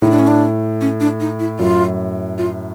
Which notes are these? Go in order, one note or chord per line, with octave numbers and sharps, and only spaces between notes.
A2 D#4
D4
C#4
D4
C#4
D4
D#4
E4
F#2 F4
F4